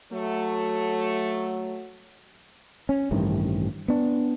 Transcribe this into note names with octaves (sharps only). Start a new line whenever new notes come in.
F#3 A3
C#4
A1 G2 C3 D#3
B3 D4